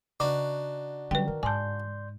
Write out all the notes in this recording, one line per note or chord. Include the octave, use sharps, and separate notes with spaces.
C#3 D4 D#4 F#4
D3 F#3 G3 C#4 B4 G5
D#3 A#4
G#2 D5 G#5 A5 C6 G6